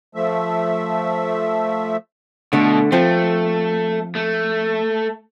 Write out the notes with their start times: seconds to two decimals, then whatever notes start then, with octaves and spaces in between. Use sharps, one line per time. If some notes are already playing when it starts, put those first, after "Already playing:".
0.15 F3 A3 E5
2.53 B2 D3 A3
2.92 F3 A3 C4
4.15 A3